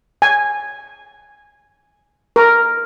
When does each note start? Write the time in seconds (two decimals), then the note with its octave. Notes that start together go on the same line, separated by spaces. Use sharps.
0.22 G#5
2.36 A#4